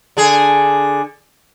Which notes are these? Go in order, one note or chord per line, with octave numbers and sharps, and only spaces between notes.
D3 G#4